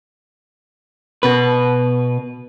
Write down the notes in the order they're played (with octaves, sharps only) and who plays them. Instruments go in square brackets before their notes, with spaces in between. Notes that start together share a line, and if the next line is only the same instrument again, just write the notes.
[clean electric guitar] B2 B4